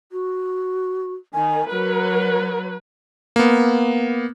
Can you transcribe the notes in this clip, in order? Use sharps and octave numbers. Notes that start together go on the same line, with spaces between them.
F#4
D#3 G#5
F#3 A#4 B4
A#3 B3